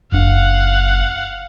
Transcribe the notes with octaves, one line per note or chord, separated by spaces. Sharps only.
F#1 F#2 D4 F5 F#5